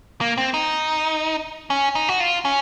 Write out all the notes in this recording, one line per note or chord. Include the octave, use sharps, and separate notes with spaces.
A#3
C4
D#4
C#4
D#4
F#4
F4
C#4